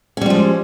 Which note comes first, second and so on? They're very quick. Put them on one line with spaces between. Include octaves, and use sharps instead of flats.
C#4 G3 F3 G#3